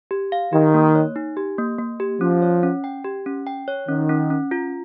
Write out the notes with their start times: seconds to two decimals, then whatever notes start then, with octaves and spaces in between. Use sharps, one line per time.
0.11 G4
0.32 F5
0.53 D#3 G4
0.74 A#3
0.95 C#5
1.16 D#4
1.37 G4
1.58 A#3
1.79 A#3
2.00 G4
2.21 F3 C#4
2.42 C#5
2.63 C#4
2.84 G5
3.04 G4
3.26 C#4
3.47 G5
3.68 C#5
3.88 D#3 C#4
4.09 C#4
4.30 C#4
4.51 F4